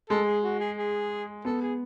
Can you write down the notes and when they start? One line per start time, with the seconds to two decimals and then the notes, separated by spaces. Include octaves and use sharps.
0.09 G#3 A4
0.27 G#4
0.44 F#4
0.60 G#4
0.77 G#4
1.45 B3 A4
1.62 G#4